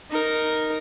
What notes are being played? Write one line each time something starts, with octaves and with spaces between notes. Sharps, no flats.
D#4 A#4